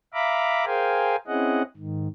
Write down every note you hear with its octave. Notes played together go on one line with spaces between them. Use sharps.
E5 F5 A#5 B5 D6
G#4 A#4 C5 F5 G5 G#5
C4 C#4 E4 G#4 D#5 F#5
G#2 D#3